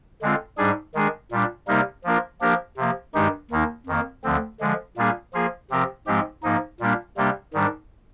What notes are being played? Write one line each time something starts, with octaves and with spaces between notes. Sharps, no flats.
D3 G#3 C4 F4
G#2 G3 D4 G#4
D#3 G#3 D4 G#4
A#2 G3 D4
C3 G3 A#3 D#4 A#4
F3 A#3 D4 F4 A#4
F3 A#3 D4 G4 A#4
C3 F3 A#3
G2 D#3 G#3 D#4 G4
D#2 D#3 A#3 D#4
F2 D#3 A#3
D2 D3 F3 C4
D3 F3 G#3
A#2 G3 A#3 D4 G#4
F3 A#3 F4 G#4
C3 F3 C4 G4 A#4
G#2 F3 G#3 C4 G4
G#2 F3 A#3 D#4
A#2 G3 A#3 D4
C3 G3 A#3 D4 G4
G#2 D#3 G3 D4